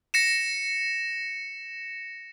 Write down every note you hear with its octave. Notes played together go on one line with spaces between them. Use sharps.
A#6 C#7 E7